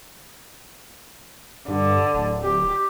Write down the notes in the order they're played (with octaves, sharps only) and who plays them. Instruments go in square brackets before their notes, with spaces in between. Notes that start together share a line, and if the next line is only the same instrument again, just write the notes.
[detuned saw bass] G2 [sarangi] D3
[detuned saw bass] D1
[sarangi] G4